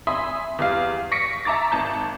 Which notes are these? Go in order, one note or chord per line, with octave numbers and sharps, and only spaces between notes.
E5 G#5 B5 C6 D#6
E2 G3 F5
C#6 A#6 B6 C#7 D7
E5 A5 A#5 D6 A6
G#1 A5 G6